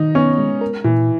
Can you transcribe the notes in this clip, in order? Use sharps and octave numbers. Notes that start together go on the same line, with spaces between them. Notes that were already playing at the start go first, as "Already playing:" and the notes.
Already playing: D#3 D#4
B3 C#4
G#3
A#4
A#2 E3